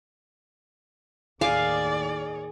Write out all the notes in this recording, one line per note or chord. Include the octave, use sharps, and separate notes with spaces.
D#2 A2 D#3 G#4 D5 F5 D6